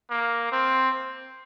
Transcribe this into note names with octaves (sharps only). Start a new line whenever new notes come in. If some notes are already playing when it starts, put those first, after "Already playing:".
A#3
C4